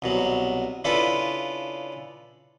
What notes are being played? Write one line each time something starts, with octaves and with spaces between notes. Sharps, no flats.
C2 B2 F#3
C#3 D4 E4 F4 A4 B4